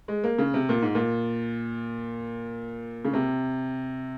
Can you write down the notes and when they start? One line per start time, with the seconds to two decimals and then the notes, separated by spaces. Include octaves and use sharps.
0.08 G#3
0.24 A#3
0.38 C#3
0.54 C3
0.69 A#2
0.82 G#2
0.95 A#2
3.05 C#3
3.13 C3